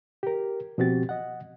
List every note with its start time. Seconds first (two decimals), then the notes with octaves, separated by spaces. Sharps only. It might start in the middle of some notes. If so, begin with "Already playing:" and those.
0.23 G4 A#4
0.78 B2 F3 C4 F#4 G4 A6
1.09 D#5 F#5